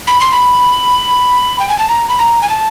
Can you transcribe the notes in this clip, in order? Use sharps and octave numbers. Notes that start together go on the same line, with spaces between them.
B5
C6
B5
G5
G#5
A5
A#5
B5
A#5
G#5
A5